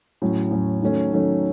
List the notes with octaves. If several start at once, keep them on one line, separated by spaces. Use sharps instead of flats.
A2 F#3 C#4
A2 F#3 C#4
D#3 F#3 A3 C#4
D#3 F#3 A3 C#4